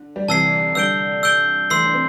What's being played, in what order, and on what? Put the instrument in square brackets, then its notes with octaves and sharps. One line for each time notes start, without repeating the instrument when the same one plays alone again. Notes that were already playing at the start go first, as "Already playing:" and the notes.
Already playing: [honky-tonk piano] D3
G3
[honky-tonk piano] C3 E3 [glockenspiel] A5 E6 C7
[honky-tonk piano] D3 G3 [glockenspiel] E6 G6 D7 G7
[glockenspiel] E6 G6 D7 G7
[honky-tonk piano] E3 A3 [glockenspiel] C6 E6 C7
[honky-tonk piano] D4
C4